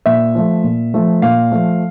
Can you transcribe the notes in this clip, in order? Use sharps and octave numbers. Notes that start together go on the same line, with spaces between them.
A#2 E5
F3 A3
A#2
F3 A3
A#2 F5
F3 A3